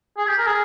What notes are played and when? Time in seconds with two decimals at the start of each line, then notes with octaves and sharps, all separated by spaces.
0.17 G#4
0.27 G4
0.37 A#4
0.47 G#4